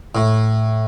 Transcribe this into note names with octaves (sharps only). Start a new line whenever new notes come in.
A2